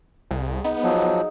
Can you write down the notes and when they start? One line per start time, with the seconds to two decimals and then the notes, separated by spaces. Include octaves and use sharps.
0.31 C2 G#4
0.64 B3 D#4
0.83 F3 F#3